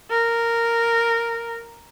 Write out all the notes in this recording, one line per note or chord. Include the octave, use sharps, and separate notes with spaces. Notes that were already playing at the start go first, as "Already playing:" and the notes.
A#4